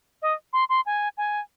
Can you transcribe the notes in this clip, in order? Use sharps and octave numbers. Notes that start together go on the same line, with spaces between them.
D#5
C6
C6
G#5
G#5